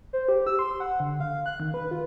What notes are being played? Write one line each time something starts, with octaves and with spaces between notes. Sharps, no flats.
C5
G4
E6
C6
F#5
D3
F5
F#6
D#3
B4
F4